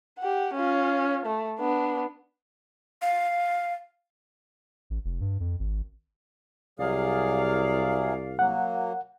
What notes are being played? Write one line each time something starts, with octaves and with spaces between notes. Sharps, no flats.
G4 F#5
C#4 F4
A3
B3 D4
F5
A1
F1
G2
F2
G#1
C2 C3 F#3 G#4 D5 F5
F#3 A#3 F#5